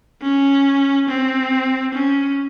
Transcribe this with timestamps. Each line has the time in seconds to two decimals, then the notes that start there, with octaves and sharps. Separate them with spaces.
0.22 C#4
1.09 C4
1.94 C#4